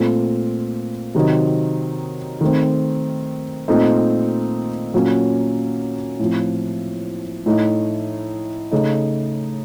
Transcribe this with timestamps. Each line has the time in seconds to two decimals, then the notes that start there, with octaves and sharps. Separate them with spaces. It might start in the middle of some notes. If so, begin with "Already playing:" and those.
Already playing: A#2 A3 C4
1.15 C3 D#3 F#3 C4 D#4
2.41 D#3 A3 C4
3.68 A#2 A3 C4 D#4
4.94 A#2 F#3 A#3 C#4
6.20 A2 F3 C4
7.46 A2 A3 D#4
8.71 C#3 A3 D#4